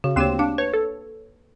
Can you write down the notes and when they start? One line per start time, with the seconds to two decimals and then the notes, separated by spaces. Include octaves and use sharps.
0.04 C#3 F#4
0.16 D2 A#3 C4 G4 C#5 E7
0.39 D4 F5
0.58 B4 C#5
0.73 A4